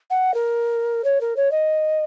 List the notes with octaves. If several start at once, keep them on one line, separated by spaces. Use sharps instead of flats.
F#5
A#4
C#5
A#4
C#5
D#5